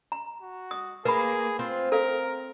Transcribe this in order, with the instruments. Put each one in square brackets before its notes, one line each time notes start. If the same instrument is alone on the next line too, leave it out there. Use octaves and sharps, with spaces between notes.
[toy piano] A#5
[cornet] F#4
[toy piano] D#6
[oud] A#3 [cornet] G#4 [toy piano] B4 B5
[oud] C4 [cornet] F4
[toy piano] A4 F5 [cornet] A#4